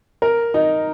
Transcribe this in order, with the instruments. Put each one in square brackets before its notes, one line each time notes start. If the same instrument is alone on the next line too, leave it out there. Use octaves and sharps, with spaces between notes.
[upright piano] A#4
D#4